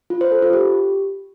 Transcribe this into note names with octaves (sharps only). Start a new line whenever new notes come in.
F4
C5
A4
F4
G4